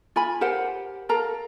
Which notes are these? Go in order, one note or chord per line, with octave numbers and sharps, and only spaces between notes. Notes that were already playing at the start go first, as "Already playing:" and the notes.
F4 G#5 B5
G4 A#4 C5 F#5
A4 A#4 F5 A#5